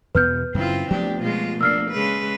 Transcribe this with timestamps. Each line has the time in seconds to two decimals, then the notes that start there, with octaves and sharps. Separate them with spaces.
0.15 E2 B2 B3 B4 F6 G6
0.54 F#2 C#3 C4 E4 F4
0.90 F3 A3 B3 D4 G4
1.22 B2 G#3 F4
1.61 A#3 D4 E6 F6 C7
1.91 C#3 G#3 B4